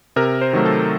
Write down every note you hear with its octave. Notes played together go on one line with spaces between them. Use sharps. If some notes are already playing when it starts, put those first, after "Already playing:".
C3 A#4
C5
D#3 F#3 A3
A4